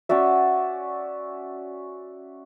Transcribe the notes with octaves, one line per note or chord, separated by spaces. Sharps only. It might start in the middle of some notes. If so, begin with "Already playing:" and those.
C#4 F#4 D5 E5